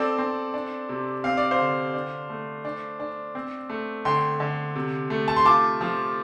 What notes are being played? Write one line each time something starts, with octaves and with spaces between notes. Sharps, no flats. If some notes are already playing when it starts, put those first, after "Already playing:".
Already playing: C4 A4 D5
C4
D4
C3
C4 F5
D5
C5 F5
D3
D4
A3
D4
D4
C4
A3
D3 G5 C6
D3
C3
A3
A5
C6
F4 A5 D6
F3